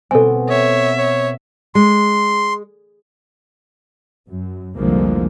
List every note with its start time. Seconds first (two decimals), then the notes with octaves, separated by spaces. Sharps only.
0.11 B2 B3 C4 A4 G#5
0.50 C#5 E5
0.98 C#5
1.75 G#3 C6
4.28 F#2
4.77 F1 C2 D3 F3 G#3 A#3